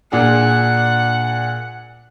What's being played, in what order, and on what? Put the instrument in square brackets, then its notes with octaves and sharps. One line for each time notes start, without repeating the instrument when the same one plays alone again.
[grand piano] A#2 D4 G#4 [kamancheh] F#5